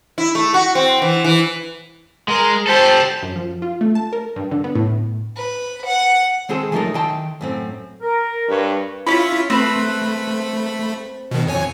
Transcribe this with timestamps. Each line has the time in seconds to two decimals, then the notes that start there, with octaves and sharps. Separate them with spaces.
0.18 E4
0.35 A3
0.54 F#4
0.75 C4
1.02 E3
1.24 E3
2.28 G#3 A#4
2.67 G4 A4 C5 A5
3.22 F#2
3.36 F3
3.62 F4
3.81 A3
3.95 A5
4.13 A#4
4.36 G2
4.51 D3
4.64 B3
4.75 A2
5.37 B4
5.87 F#5
6.49 D#3 G#3 C4 G#4 A4
6.72 F3 F#3 A3 D#4 A4 A#4
6.94 D#3 E4 G5 A5 C6
7.41 F#2 A2 C4
8.02 A#4
8.49 G2 B4 C#5
9.07 C#4 E4 F4 C#5 B5
9.50 A3 C4 B4 B5
11.31 B2 D#3
11.47 F2 C#5 G#5